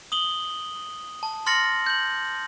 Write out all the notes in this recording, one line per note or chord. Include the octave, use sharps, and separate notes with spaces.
D#6 F#7 G7
A5
C6 F6 A6 A#6 C#7 F#7
G6 F#7